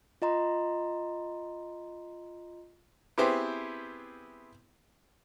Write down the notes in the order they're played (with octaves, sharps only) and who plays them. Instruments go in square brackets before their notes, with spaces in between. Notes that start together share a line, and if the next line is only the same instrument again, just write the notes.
[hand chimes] F4 D#5 A#5 C6
[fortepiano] B3 C4 E4 G4 G#4 C5